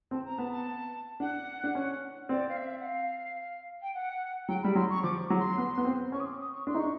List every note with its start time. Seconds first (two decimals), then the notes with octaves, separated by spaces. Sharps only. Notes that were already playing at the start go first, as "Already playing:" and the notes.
0.11 C4 A5
0.25 A#5
0.38 B3 A5
0.52 A5
1.20 D4 F#5
1.64 D4
1.75 C#4
2.29 C4 D5
2.48 F5
2.57 E5
2.80 F#5
2.84 F5
3.82 G5
3.94 F#5
4.48 F#3 G5
4.62 G3 B5
4.75 F#3 C6
4.89 C#6
5.03 F3 D6
5.30 F#3
5.40 C6
5.58 B3
5.78 B3
5.85 C4
6.12 C#4 C#6
6.20 D#6
6.26 D6
6.40 D#6
6.53 C#6
6.67 D4 C6
6.75 D#4
6.79 D4 C#6